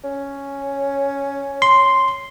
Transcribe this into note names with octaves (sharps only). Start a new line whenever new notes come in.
C#4
C6